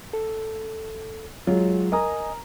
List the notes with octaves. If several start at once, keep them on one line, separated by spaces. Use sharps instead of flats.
A4
F#3 G#3 F4
A#4 D#5 G#5 A#5 D#6